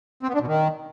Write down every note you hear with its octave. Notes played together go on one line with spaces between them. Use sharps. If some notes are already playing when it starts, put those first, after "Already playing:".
C4
B3
D4
B2
D#3